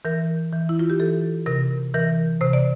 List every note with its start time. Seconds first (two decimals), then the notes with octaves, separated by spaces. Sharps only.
0.05 E3 A#4
0.53 E3
0.69 E4
0.79 F4
0.90 G4
1.00 E3 A4
1.46 C3 A#4
1.94 E3 A#4
2.41 C3 C5
2.53 D5